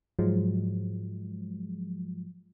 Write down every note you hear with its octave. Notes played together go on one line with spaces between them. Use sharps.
G#2 F3 F#3 G#3